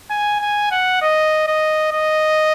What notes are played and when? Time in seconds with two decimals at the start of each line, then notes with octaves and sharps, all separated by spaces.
0.10 G#5
0.41 G#5
0.71 F#5
1.02 D#5
1.47 D#5
1.92 D#5